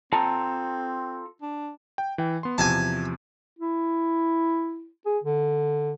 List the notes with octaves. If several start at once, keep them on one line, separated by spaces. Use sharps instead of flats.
C4 F4 A4 A5 A#5
D4
G5
E3 G5
B3 C6
E2 C3 F3 G#5 A5
E4
G#4
D3